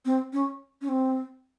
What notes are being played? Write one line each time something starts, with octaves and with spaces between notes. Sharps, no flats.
C4
C#4
C#4
C4